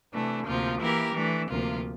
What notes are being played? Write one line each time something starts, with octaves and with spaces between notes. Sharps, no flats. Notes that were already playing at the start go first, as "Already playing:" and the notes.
C3 E3 A3 D4
D2 C3 F3 A#3 F4
E3 A#3 E4 G4 A#4
E3 A3 D4
D2 C3 F3 A#3 F4